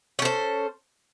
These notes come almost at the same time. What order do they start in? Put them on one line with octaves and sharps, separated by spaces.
C#4 A4 C5